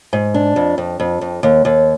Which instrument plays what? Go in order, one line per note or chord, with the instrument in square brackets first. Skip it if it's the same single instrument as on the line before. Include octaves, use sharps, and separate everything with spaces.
[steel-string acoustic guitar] G#2
D4
F2
F2
F2
F2
D#2
D#2